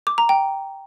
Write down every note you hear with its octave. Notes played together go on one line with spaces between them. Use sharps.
D6
A#5
G5